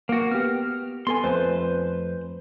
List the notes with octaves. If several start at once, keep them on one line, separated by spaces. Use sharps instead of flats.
A#3 F#4
B3 G4 F6
B3 A4 G#5 C6
F2 A3 B4 C5 A5